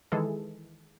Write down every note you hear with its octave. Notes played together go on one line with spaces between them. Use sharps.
D#3 E3 G#3 G#4 A4